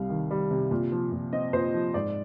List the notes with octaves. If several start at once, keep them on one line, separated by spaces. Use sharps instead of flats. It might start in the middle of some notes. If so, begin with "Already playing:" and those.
Already playing: C2 C3 G3 F5
D#3
G3
C3
A#2
F3
A#2
C4 D#5
A#2 C5
F3
G#2 D5